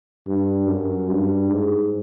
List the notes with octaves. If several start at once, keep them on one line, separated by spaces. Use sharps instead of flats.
G2
F#2
G2
G#2